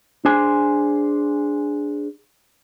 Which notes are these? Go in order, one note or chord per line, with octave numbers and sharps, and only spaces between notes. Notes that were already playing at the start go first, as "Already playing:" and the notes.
D4 G#4 C5 G#5